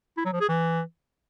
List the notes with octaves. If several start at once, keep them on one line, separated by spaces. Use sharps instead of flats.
E4
F#3
F3
G#4
E3